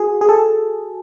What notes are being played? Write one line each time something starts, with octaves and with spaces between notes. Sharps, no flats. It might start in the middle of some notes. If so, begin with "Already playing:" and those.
Already playing: F#4 G#4
G#4
A4